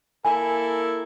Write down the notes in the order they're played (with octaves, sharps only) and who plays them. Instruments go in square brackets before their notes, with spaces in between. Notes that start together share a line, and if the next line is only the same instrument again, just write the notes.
[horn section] A#3 E4 A4 [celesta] G#5